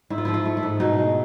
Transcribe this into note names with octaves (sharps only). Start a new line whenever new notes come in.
G#2 E4
F4
F3 E4
F4
A3
E4
G#2
B2 D#4
G#3